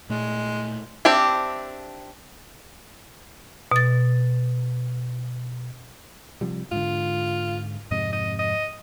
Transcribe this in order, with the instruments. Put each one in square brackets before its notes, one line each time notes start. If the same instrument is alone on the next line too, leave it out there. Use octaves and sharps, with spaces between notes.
[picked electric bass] A#2 A3 [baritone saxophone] G#3
[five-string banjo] C4 D4 G4 E5 G5
[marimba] B2 A6
[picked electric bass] C3 F3 G3
[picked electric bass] G#2 D3 [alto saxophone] F4
[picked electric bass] F2 G#2 C3 [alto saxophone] D#5
[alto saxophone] D#5
D#5